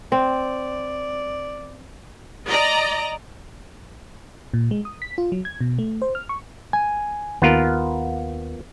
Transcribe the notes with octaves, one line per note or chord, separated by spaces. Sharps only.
C4 D5
D5 D#5 A#5
A#2
G#3
D#6
B6
F4
F#3
G#6
B2
A3
C5
F6
C#6
G#5
D#2 B3 F4 A#4